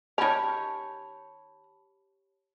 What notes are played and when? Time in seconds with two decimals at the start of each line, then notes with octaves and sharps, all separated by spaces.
0.18 D#3 C#4 G4 C#5 A5 B5 F7